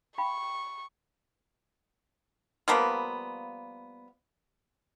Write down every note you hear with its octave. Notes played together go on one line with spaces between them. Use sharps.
F5 G5 B5 C#6
F3 G3 A#3 B3